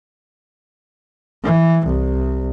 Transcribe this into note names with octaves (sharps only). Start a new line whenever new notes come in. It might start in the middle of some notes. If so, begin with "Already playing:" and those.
E3
C2